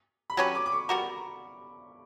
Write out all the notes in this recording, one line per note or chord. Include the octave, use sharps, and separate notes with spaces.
B5
F#3 C#4 G4 B4 C#6
D6
D6
C#6
G3 B3 F#4 A#4